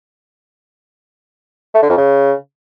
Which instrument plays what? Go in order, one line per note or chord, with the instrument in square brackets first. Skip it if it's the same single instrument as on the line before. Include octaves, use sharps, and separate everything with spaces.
[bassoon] A3
D3
F2
C#3